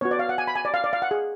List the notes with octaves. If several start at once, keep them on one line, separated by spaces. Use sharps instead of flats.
B3 F#4 C#5
D5
F5
F#5
G#5
B5
G#5
D5
F5
D5
F5
F#5
G#4